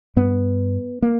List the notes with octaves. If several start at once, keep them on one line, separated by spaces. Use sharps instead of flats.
G2 B3
A#3